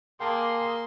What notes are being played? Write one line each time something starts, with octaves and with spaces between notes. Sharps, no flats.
A#3 G#4 G5 A5 C6 D6